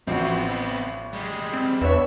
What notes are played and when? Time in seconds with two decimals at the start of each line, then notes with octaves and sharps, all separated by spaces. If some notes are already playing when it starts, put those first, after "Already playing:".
0.07 A1 F3 B3 C4 F#4
1.13 G3 G#3
1.53 C4
1.81 E2 B3 D4 C#5 E5